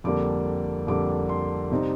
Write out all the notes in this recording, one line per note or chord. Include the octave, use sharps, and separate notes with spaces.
F2 D3 G3 A#3 D6
F2 D3 G3 A#3 D6
C6
C3 G3 C4 D#4